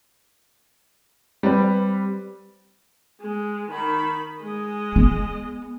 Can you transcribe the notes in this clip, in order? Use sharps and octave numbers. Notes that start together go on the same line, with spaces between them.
G3 C4 B4
G#3
D#3 B5
G#3 D#5
B3